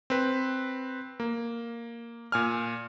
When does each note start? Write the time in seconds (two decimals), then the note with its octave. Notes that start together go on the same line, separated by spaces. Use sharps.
0.10 C4 B4
1.20 A#3
2.32 A#2 G#5 F6